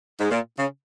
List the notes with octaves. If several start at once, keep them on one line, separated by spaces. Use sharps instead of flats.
G#2
A#2
C#3